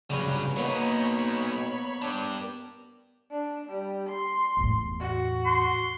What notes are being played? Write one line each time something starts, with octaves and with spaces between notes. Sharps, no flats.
C#3 F#3 G3 B4
F#3 A#3 B3 D#4 C#5 B5
D4 G4
D4
G3
C6
E2 A2
F#4
C6